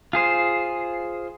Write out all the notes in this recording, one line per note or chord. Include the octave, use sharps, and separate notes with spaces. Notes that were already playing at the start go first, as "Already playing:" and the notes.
F4 G#4 C5